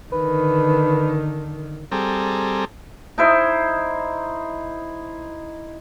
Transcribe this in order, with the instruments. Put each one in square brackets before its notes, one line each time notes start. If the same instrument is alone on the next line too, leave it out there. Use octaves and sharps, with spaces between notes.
[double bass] D3 D#3 [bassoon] B4
[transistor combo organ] G3 C4 G#4 A4 A#5
[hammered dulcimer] D#4 E4 C5